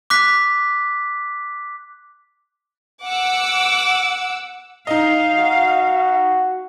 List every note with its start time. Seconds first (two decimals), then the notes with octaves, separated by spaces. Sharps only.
0.10 D6 F#6 B6
3.04 F#5 D6 E6
4.87 D#4 D#5 F5
5.38 F#4